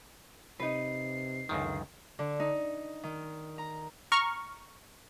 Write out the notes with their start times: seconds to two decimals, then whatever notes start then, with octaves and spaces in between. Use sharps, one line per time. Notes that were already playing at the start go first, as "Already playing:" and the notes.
0.60 C3 D#4 B4 C7
1.49 C#2 F#2 D3 D#3
2.19 D3
2.40 D#4
3.03 D#3
3.58 A#5
4.12 A#5 C#6 F6